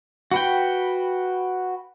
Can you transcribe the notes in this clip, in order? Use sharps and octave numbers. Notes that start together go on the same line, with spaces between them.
F#4 B4 G5